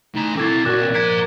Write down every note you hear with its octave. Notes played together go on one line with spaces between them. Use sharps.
A2 D#4 A#5
C4 E4 A4 D6 G#6 A6
B1 A#2 F#4 D6 F#6 A#6
C4
F3 G#4 A#5 G#6 B6 D7